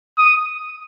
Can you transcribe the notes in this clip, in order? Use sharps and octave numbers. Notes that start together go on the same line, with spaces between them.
D#6